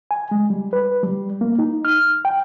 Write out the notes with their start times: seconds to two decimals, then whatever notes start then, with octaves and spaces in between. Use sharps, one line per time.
0.11 G#5
0.31 G#3
0.50 G3
0.73 B4
1.03 G3
1.41 A#3
1.59 D#4
1.85 F6
2.25 G5